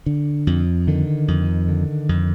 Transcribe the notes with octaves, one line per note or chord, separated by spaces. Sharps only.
D3
F2
D3 D#3
F2
D3
F2